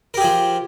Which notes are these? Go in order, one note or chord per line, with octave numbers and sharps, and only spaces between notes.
F3 G4 G#4 A#4